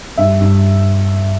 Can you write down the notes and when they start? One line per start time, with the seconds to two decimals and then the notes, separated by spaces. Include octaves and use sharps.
0.18 G2 E5
0.40 G2